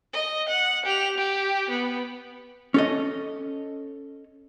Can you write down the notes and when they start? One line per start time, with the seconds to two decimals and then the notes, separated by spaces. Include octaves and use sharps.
0.13 D#5
0.49 F#5
0.85 G4 F7
1.17 G4
1.70 B3
2.74 C#4 A4 D#5